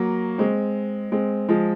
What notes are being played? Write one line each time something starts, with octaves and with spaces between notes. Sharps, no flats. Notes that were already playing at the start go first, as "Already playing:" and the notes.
Already playing: F#3 A#3
G#3 C4
G#3 C4
F3 G#3